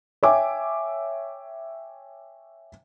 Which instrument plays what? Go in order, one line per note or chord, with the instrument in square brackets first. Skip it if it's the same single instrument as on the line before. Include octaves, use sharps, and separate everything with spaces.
[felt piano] C#5 E5 G5 G#5 D6